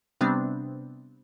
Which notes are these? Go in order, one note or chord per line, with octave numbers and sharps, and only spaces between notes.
C3 G3 B3 C4 D4